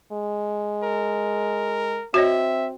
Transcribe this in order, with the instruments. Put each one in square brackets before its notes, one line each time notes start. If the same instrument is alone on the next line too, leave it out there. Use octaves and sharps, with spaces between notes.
[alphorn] G#3
[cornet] A#4
[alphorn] C4 [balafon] F#4 C#5 D#5 [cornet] E5